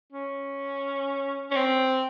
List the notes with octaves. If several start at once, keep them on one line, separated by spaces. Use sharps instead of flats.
C#4
C#4
C4